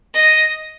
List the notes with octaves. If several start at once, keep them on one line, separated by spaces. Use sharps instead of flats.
D#5